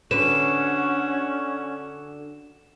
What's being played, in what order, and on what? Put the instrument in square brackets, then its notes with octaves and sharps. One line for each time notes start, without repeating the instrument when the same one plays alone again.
[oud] D3 B4 [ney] C#4 [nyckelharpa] F#4 [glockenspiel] E7